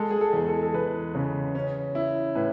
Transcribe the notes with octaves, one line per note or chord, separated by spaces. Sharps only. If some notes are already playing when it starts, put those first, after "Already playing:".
Already playing: G#3 A4
G#4
A4
E2
A4
A4
E2 B4
C#3
C#4
E4
A2 B4